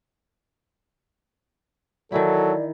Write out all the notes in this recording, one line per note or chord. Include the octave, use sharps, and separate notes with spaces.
D#3 E3 F#3 E4 A4 D5